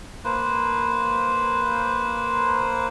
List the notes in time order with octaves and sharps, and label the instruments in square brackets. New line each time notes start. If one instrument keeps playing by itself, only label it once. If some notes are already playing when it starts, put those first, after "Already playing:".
[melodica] A#3 B4 C5